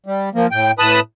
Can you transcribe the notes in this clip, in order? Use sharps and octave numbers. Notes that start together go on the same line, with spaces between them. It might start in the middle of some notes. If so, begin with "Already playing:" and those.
G3
F3 A#3
A2 G5
A2 B4 A5 B5 D#6